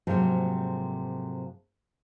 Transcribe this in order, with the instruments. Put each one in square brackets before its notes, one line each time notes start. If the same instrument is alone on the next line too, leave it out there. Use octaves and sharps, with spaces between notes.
[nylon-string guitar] G#2 C3 F3 F#3 A3 A#3